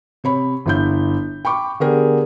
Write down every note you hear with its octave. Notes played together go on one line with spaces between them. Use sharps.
C3 C#5 B5
G1 E4 G6
G5 B5 C#6 D6
D3 B3 G4 G#4 A#4